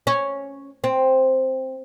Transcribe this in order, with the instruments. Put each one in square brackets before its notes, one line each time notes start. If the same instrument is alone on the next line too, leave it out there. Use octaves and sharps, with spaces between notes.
[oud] C#4
C4